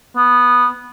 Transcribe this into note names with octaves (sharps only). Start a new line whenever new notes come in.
B3